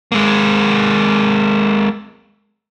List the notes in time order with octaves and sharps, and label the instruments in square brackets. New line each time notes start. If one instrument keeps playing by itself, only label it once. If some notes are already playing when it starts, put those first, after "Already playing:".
[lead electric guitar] G#3 A#3